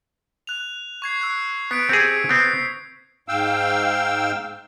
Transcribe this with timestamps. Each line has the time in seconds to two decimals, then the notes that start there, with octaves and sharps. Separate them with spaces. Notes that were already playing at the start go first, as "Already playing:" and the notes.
0.47 F#6 F7
1.02 C#6 G#6 C7
1.21 E6 F#6
1.71 B3 B6 C#7 D7
1.89 C4 G4 G#4
2.29 B3 C4 C7
3.28 G#2 F5 G5 E6